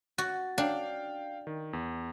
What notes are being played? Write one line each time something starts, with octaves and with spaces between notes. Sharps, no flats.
F#4 A6
D4 F5 G5
D#3
E2